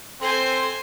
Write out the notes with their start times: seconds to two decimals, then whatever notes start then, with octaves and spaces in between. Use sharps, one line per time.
0.21 C4 A4 C5 G#5 C6